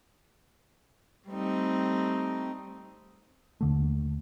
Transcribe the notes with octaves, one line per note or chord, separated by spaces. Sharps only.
G3 A3 C4 D#4
D#2 D3 A3